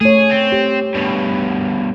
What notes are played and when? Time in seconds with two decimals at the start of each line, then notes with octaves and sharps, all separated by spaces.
0.01 A3 G#4 C#5
0.31 C4
0.52 G4
0.95 G2 B2